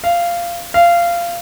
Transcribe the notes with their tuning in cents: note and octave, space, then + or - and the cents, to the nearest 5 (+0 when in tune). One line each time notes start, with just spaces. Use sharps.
F5 -15
F5 -20